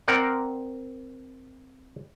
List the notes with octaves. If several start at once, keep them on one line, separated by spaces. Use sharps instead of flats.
C4 A#4 D5 F#5